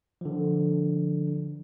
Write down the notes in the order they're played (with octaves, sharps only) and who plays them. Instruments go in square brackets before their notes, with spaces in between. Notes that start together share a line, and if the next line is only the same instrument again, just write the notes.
[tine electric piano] D3 F3